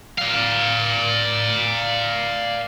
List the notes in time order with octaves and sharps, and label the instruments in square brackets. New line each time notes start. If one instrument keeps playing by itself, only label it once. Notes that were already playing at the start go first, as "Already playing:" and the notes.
[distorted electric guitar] D5 F5